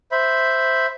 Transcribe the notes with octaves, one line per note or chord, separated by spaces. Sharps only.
C5 E5 B5